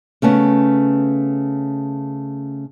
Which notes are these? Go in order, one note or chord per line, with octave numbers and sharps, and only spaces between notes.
C#3 A3 B3 C#4